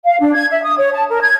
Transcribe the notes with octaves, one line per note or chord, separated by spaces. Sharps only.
F5
D4
G#6
E5
D#6
C#5
A5
A#4
G#6